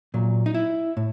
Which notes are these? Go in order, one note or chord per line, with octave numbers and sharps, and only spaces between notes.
A#2 F#3
D#4
E4
A2